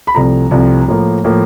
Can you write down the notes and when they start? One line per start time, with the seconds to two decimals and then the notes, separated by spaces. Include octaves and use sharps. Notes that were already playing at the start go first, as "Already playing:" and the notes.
0.07 B5
0.15 C2 C3 F3 A3 A#5
0.51 C2 C3 F3 A3
0.88 A2 F3 A#3
1.24 A2 F3 A#3